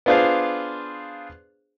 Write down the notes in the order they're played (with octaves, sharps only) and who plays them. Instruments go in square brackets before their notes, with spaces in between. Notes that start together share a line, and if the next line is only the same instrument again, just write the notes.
[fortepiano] B3 D4 F4 G#4 C5 F5